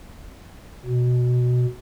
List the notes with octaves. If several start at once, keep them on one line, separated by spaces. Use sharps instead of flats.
B2